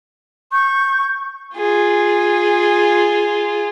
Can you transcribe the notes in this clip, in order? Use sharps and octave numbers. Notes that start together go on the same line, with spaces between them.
C#6 G6
F4 G#4